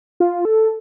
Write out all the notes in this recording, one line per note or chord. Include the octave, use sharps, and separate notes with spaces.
F4
A4